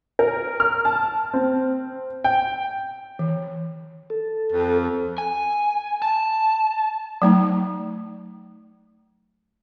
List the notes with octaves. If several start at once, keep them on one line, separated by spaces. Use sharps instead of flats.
A#4
F6
A5
C4
G5
E3
A4
F2
G#5
A5
F#3 A3 D#4